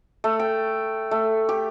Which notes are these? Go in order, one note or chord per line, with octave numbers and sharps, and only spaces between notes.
A3
G5
A3
G4